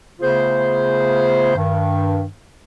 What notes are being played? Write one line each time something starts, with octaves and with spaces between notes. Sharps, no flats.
C#3 A3 B3 F4 G#4 C5
G2 D#3